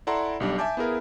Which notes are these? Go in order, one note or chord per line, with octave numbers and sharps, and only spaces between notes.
E4 A4 D5 F#5 A#5 C6
B1 G3 D4
E5 G#5 A5 D6 G6
B3 E4 G#4 A#4 F5